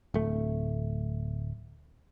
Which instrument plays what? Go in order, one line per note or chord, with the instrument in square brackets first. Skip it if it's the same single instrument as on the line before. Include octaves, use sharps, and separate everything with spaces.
[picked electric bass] D1 A3